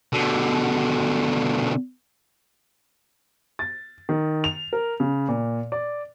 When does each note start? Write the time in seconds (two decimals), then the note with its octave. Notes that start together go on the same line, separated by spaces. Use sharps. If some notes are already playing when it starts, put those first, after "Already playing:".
0.13 B2 D3
3.59 A6
4.09 D#3
4.44 F7
4.73 A#4
5.00 C#3
5.28 A#2
5.72 D5